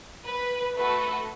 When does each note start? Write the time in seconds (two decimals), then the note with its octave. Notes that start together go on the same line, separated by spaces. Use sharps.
0.26 B4
0.76 A3 F#4 A4 B4